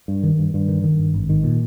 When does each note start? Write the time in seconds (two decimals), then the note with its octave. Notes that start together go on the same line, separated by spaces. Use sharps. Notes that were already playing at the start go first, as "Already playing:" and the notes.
0.08 G2
0.23 D#3
0.39 G2
0.54 G2
0.69 D#3
0.84 D#3
0.99 G2
1.14 G#1
1.29 D#3
1.44 A#2